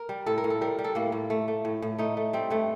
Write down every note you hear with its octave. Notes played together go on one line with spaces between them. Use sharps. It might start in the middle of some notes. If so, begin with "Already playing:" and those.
Already playing: A#4
G3
A2 A4
A#4
A2
A4
G3 A#4
G3
A4
A2 A#3
A2
A3
A3
A2
A2
A3 D#4
A3
G3 C4
G2 A3